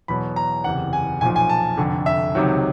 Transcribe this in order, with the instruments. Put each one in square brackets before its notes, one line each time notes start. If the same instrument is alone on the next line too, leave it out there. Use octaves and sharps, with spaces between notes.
[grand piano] E2 B2 F#3 B5
A#5
F#1 E2 C3 F#5
G#5
B1 G#5
A#2 F3
G#5
A5
F1 F2 D3
E5
C#2 C3 D#3 F#3